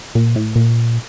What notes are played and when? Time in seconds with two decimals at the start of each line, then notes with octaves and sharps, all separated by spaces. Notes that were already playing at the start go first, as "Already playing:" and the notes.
0.15 A#2
0.36 A2
0.56 A#2